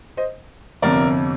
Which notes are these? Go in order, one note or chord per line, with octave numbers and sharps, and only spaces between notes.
C5 D#5
G1 F2 C3 A#4 D5